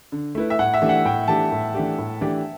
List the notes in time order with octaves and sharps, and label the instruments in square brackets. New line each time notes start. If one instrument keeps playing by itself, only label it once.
[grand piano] D3
A3 E4 B4
[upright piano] E5
[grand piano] A2 [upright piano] F#5
[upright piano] E5
[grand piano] E3 A3 D4 G4
[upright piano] F#5
[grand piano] A2 [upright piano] G5
[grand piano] E3 A3 D4 G4 [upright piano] A5
[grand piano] A2
E3 A3 D4 G4
A2
E3 A3 D4 G4